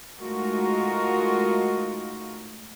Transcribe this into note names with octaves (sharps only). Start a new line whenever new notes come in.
G#3 A3 D#4 F4 F#4 A#4